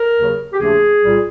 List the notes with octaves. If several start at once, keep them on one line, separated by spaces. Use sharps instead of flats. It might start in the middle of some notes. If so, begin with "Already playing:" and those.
Already playing: A#4
D#2 C#3 F#3
G4
D#2 C#3 F3 A3 D4 G#4
C2 A#2 G3